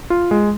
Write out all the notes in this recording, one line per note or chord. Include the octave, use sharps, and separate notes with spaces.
F4
G#3